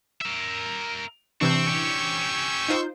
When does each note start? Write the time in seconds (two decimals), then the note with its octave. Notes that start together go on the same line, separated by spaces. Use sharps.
0.21 A#4 E5
1.41 C3 E3 C4 D4 C#6 E6 G6
1.67 C#4 G4
2.68 D#4 F4 C5